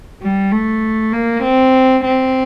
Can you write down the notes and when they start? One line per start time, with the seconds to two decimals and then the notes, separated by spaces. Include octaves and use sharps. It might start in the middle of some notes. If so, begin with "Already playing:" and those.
0.23 G3
0.52 A3
1.12 A#3
1.44 C4
2.04 C4